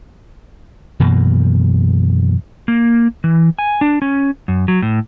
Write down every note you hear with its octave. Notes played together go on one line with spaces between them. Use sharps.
F#2 B2 E3 A#3
A#3
E3
G#5
D4
C#4
F#2
F#3
A2